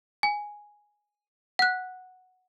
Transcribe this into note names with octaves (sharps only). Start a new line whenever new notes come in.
G#5
F#5 F#6